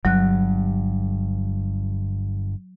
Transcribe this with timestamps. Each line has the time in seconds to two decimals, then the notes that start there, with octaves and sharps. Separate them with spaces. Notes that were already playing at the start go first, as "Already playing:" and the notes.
0.05 G1 G2 F#3 F#6